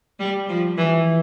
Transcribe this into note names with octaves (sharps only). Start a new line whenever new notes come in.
G3
F3
E3